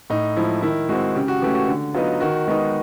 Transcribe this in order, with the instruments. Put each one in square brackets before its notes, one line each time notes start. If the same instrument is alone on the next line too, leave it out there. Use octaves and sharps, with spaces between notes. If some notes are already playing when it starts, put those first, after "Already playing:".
[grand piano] A2 D#4
F3 G#3 E4
D#3 E4
G#3 C4 F#4
C#3 G4
F#4
E3 A3 C#4 G4
F#4
D3
F#3 B3 D#4 F4
D#3 F#4
G#3 B3 D#4 F#4